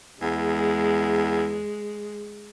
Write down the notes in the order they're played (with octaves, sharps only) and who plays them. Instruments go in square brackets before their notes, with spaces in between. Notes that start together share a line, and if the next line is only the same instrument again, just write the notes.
[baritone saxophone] E2 [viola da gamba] G#3